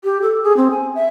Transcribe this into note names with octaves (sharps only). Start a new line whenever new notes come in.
G4
A4
G#4
C4
G#5
E5